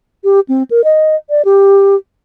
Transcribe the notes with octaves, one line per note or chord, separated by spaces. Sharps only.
G4
C4
A#4
D#5
D5
G4